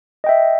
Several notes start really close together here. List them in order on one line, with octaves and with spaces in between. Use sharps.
D#5 G5 E5